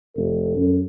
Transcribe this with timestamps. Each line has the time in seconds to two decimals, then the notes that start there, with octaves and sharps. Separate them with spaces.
0.16 F1 A4
0.56 F#2